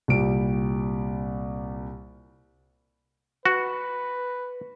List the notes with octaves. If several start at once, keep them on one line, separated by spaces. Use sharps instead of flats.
C2 A#2 G3 D7
F#4 B4